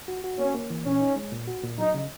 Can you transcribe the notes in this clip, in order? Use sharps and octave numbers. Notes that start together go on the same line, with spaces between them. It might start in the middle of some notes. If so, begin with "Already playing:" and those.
F#4
F#4
A#3 C#4
A#3
E3
A#2 C#4
D#4
G#3
A#2
F#4
A#2
F#3 D#4
C#3